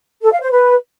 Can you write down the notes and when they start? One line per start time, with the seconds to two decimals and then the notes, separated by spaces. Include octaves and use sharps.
0.22 A4
0.32 F5
0.41 C5
0.51 B4